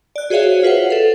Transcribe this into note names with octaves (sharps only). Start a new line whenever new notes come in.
D5 F#6
F#4 G#4 C5 C#5 E5 F5
F4 B4 C5 F#5
A4 F5